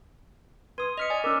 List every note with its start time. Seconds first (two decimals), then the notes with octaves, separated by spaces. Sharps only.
0.78 B4 C6 D#6 G#6 D#7
0.97 D#5 D#6 F6 B6 C#7 F7
1.10 D5 G#5
1.24 C#4 A#4 D6 E6